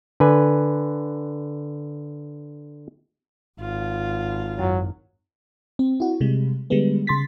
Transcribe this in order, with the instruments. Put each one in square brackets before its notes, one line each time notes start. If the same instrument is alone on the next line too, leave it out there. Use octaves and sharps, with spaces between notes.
[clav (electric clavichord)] D3 B4 G#5
[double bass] G#1 [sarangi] F4
[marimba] F#2 [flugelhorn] F#3
[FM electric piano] C4
E4 F#4
C3 G3 G#3
D3 G3 G#3 B3
C#3 C6 A6 B6